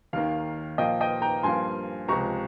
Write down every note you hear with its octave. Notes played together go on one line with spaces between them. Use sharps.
D#2 D#3 A#3 F5
A#2 F3 A#3 D#5 G5
D#5 G5
G5 A#5
G2 F3 A#3 G#5 C6
C#2 C3 F3 G#3 A#5 C#6